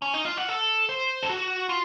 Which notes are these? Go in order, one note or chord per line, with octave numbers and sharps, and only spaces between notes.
C#4
D#4
F4
F#4
A4
C5
A4
F#4
F4